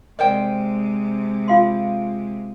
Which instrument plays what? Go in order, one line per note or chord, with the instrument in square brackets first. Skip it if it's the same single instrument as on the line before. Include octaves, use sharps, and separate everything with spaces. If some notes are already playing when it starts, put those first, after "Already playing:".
[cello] C3 G#3 [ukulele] A#4 C5 G5 [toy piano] D5 D#5
[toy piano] F4 F5 C6